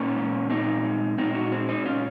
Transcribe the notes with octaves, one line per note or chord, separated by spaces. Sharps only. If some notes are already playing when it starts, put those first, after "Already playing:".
Already playing: A#2 A#3 C#4
G#3
A#2 C4 D#4
G#3
A#2 C4 D#4
D#4 F#4
G#3 C4
C4 D#4
A#2 C#4 F4